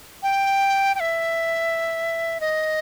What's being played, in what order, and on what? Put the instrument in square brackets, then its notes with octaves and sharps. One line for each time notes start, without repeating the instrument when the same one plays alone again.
[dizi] G5
G5
E5
D#5